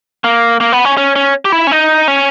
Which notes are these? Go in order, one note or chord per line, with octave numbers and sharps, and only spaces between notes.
A#3
A#3
B3
C#4
C#4
C#4
G4
E4
C#4
D#4
C#4